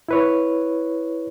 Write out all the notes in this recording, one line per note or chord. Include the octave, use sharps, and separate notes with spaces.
E4 B4 C#5